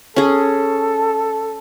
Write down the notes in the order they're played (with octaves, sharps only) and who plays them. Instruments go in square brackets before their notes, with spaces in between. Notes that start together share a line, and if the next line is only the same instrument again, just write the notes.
[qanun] C#4 G#4 [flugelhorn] A4